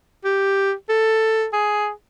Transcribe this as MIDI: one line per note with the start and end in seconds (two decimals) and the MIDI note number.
0.24 0.73 67
0.89 1.47 69
1.53 1.90 68